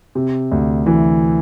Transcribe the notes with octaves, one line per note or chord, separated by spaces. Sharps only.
C3
D2
E3